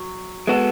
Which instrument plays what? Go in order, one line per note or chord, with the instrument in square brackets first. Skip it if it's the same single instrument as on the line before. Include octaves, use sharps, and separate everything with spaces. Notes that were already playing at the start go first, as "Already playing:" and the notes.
Already playing: [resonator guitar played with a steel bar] F#3
[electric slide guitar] G#3 B3 F#4 A4